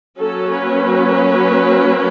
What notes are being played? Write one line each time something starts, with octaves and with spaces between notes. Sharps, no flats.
F#3 A#3 C#4 A4
B4